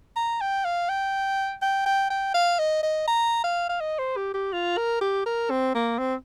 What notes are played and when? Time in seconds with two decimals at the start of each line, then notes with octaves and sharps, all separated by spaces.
0.16 A#5
0.41 G5
0.65 F5
0.89 G5
1.62 G5
1.86 G5
2.10 G5
2.35 F5
2.59 D#5
2.83 D#5
3.08 A#5
3.44 F5
3.69 F5
3.81 D#5
3.99 C5
4.17 G4
4.34 G4
4.53 F4
4.77 A#4
5.01 G4
5.26 A#4
5.51 C4
5.75 A#3
5.99 C4